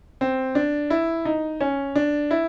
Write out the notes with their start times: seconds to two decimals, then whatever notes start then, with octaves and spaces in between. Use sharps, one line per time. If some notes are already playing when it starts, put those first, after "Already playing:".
0.21 C4
0.55 D4
0.90 E4
1.25 D#4
1.61 C#4
1.96 D4
2.31 E4